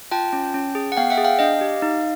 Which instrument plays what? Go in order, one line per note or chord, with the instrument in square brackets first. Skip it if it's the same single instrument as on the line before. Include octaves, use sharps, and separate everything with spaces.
[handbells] F4 G5 A5
C#4
C#4
G#4
F#5
B3 F5 G5
E5 F#5
G#4
F5 G5
D4 D#5 F5
G4
D#4